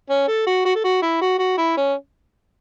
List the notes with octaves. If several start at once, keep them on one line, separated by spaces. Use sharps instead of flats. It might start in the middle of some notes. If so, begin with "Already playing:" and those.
C#4
A4
F#4
F#4
A4
F#4
E4
F#4
F#4
E4
C#4